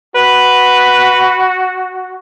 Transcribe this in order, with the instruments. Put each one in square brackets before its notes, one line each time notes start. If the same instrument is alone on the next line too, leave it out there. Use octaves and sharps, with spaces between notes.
[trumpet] F#4 [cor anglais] B4